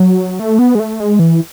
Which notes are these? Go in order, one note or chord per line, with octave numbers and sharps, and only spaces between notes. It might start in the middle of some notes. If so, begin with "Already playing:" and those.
Already playing: F#3
A3
B3
G#3
A3
G#3
E3